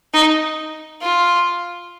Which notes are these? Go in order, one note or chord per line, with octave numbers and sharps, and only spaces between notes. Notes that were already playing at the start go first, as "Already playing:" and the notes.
D#4
F4